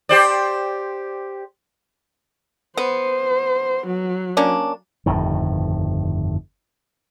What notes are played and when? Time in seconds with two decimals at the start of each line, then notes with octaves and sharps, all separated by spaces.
0.09 G4 C5 D5
2.77 B3 C5
3.87 F#3
4.37 A#3 C#4 D4
5.06 G1 F2 A2 D#3